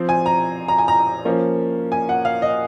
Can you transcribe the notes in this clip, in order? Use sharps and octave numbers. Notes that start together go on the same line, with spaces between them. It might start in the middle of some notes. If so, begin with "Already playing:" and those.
Already playing: F3 C4
G#5
A#5
A#5
G#5
A#5
F3 A#3 C#4
G#5
F#5
F5
D#5